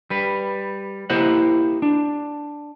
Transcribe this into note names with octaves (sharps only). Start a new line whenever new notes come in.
G3 B4
A#3 E4 G4 C5 D#5 F#5
D4